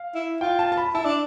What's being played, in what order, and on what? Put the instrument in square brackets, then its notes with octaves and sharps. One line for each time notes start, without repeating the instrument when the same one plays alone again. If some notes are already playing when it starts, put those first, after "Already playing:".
Already playing: [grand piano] F5
[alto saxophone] E4
[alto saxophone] F4 [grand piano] G5
[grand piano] A5
A5
B5
[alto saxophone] E4 [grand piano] A5
[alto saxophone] D4